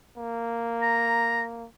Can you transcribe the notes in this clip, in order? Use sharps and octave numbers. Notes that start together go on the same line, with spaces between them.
A#3
A#5